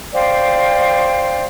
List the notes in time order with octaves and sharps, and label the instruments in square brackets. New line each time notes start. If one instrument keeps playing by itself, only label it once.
[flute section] C5 D5 F5 G5